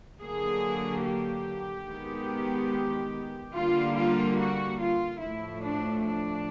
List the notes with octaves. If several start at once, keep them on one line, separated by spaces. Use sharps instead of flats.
D3 F#3 A#3 G#4
G4
D#3 G#3 B3
D3 G3 A#3 F4
F4
F#4
F4
A2 F3 A3 E4
D4
D4